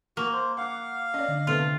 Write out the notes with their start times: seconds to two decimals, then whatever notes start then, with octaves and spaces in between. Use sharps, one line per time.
0.17 A#3 F#4 A#4
0.33 C5
0.57 F5 F#5 D6
1.14 C#4 D5 D#5
1.28 D3
1.47 C3 A3 B3 F4